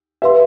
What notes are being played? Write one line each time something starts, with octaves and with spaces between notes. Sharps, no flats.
G4 B4 E5 F5 C6